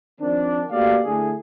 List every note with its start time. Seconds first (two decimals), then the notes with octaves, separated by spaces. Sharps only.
0.20 D#3 F3 C4 D4
0.71 A3 A#3 F#4 G4 D5 F5
1.05 D3 A3 E4 G#4